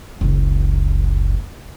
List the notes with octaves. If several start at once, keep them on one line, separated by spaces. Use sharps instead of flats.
F#1 C#2